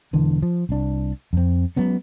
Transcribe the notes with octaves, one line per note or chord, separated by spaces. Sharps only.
E1 D3 E3
F3
C2 D4
F2 C4
F#3 G#3 B3 C#4